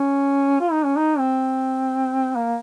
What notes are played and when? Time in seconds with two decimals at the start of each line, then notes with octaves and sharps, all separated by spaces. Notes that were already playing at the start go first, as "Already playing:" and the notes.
Already playing: C#4
0.60 F4
0.72 D#4
0.85 C#4
0.97 D#4
1.18 C4
2.36 A#3